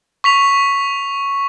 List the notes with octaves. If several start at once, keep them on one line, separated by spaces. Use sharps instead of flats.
C#6 B6 F7